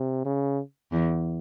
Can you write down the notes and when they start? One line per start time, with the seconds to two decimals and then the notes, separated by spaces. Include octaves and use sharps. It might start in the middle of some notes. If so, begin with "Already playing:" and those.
Already playing: C3
0.25 C#3
0.92 E2